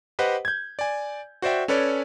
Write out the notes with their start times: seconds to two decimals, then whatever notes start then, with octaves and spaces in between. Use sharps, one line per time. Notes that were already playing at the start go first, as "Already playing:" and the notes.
0.19 G4 B4 C5 D#5 F#5
0.45 G6 G#6
0.79 D5 G#5
1.42 F#4 C5 D5 E5 G5
1.68 C#4 A4 B4 C#5 D5